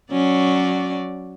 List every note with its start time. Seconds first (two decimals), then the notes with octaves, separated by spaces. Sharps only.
0.12 F#3 C#4 D5